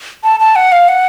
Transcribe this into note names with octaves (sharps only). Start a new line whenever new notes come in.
A5
A5
F#5
F5
F#5